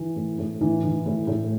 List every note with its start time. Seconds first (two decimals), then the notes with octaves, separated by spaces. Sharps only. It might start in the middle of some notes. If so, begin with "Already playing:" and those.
Already playing: E3
0.16 A2
0.39 A2
0.61 E3
0.84 E3
1.06 A2
1.27 A2